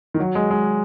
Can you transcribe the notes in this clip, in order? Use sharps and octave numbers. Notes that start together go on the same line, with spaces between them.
D#3
F#3
G#3
G#3